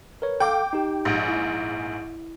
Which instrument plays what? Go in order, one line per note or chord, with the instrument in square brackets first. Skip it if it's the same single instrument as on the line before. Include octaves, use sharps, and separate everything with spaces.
[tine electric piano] A#4 B4 C#5
[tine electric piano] A4 F5 [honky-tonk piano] G5 D6
[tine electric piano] D#4 G4
[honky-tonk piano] A#1 G#2
[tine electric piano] E4